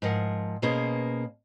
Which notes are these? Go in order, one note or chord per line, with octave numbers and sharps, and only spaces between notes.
G#2 F3 A#4 F#5
B2 A#3 C#4 G#4 C5